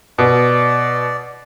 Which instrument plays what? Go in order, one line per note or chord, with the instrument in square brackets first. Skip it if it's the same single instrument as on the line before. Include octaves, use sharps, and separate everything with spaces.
[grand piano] B2 [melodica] D5